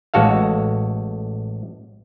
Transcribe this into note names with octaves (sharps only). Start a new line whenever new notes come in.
A1 G#3 F#4 A4 F5